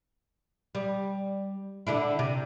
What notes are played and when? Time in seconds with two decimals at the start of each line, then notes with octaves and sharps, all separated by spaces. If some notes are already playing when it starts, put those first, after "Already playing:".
0.75 G3
1.87 D3 D4 E4
2.19 C3